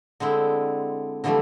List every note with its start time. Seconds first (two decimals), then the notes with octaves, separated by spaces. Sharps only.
0.20 D3 G#3 C4 E4
1.24 D3 E3 F3 G3 A3